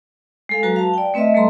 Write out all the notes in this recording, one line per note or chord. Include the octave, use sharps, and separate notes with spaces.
G#3 A4 F5
F#3 F#4 B4 A#5
F5 A5
D5 G5
A3 C4 B4 D#5 E5
G3 A3 A4 D#5 A#5 C6